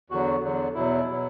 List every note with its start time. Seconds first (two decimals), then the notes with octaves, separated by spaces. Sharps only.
0.10 E2 D3 F#3 F#4
0.42 E2 D3 F#3
0.75 E2 B2 F#3 E4
1.09 B2 F#3